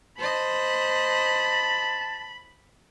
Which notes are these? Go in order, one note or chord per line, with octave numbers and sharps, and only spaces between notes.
C5 D#5 A5 B5